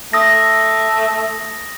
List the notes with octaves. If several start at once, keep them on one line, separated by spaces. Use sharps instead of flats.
A3 D#6 A#6